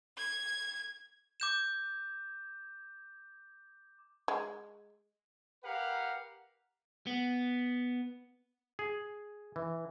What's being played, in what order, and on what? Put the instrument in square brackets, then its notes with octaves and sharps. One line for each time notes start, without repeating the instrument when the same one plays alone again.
[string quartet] G#6
[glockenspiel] D6 G6 E7
[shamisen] G#3
[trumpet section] G4 A#4 B4 F5 F#5
[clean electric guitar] B3
[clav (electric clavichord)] G#4
E3